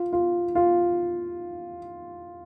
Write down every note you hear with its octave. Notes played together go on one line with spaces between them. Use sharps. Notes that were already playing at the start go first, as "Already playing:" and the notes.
Already playing: F4
F4
F4